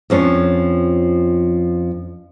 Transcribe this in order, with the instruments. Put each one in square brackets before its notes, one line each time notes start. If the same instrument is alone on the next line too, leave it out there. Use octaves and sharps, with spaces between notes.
[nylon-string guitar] F2 F3 C#4 D4